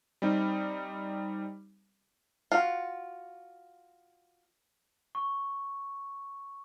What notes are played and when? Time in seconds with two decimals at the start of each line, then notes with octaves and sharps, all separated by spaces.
0.22 G3 C4 D#4
2.52 F4 F#4
5.15 C#6